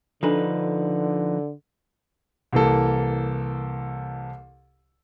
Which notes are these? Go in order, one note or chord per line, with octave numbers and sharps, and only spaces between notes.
D3 F3 D4 D#4 A4 B4 G#5
C2 E3 A#3 A4